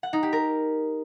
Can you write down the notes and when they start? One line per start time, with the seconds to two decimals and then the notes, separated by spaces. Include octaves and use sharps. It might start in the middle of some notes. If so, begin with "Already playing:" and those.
0.03 F#5
0.13 D#4
0.23 G4
0.33 A#4